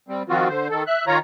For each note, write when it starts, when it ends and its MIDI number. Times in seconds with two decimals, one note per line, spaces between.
0.09 0.23 55
0.09 0.23 60
0.29 0.48 51
0.29 0.48 53
0.29 0.48 60
0.29 0.48 65
0.29 0.48 66
0.49 0.68 50
0.49 0.68 72
0.70 0.83 51
0.70 0.83 69
0.87 1.05 76
0.87 1.05 90
1.07 1.18 51
1.07 1.18 65
1.07 1.18 73
1.07 1.18 82